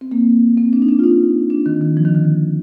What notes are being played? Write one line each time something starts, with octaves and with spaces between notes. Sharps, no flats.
C4
A#3
C4
D4
D#4
D4
F4
D#4
D4
D#3
D#3
F3
D#3
D3
D#3